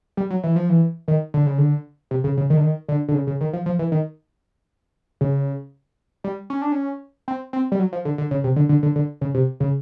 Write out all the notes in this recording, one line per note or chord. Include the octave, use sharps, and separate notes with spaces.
G3
F#3
E3
F3
E3
D#3
D3
C#3
D3
C3
C#3
C#3
D#3
D3
D#3
D3
D3
C#3
C#3
D#3
F3
F3
E3
D#3
C#3
G3
C#4
D4
C#4
C4
C4
G3
F#3
F3
D3
D3
C#3
C3
D3
D3
D3
D3
C#3
C3
C#3